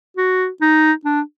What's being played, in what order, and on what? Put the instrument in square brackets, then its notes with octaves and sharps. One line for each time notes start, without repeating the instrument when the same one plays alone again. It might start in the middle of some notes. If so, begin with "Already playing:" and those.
[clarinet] F#4
D#4
D4